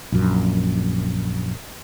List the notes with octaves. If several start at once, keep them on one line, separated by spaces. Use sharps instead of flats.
A#1 F#2